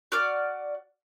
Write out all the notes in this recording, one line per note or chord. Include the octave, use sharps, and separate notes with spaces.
F#4 D5 F6